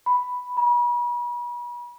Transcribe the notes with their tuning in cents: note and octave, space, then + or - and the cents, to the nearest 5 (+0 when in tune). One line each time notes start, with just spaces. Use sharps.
B5 +0
B5 -40